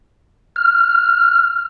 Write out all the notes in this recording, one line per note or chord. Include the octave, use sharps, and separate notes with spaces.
F6